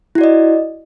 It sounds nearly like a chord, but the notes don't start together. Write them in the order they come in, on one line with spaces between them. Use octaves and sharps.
E4 F#4 D5 D#5